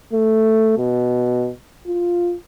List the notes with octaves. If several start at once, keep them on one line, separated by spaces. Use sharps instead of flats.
A3
B2
F4